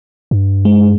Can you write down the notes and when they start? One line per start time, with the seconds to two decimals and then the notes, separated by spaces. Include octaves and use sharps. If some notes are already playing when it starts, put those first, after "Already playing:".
0.31 G2
0.65 G#3